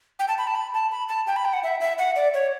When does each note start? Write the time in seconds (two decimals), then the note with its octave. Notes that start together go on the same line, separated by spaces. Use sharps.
0.19 G5
0.28 A5
0.38 B5
0.47 A5
0.55 B5
0.74 A5
0.91 B5
1.09 A5
1.27 G5
1.36 B5
1.45 G5
1.53 F#5
1.63 E5
1.80 E5
1.99 F#5
2.16 D5
2.34 C#5